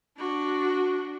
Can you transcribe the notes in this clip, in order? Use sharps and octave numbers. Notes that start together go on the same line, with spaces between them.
D4 F#4